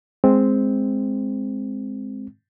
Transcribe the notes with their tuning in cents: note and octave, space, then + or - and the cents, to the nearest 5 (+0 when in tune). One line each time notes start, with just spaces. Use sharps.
G#3 +0 C4 +0